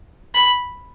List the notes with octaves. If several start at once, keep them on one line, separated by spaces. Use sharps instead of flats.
B5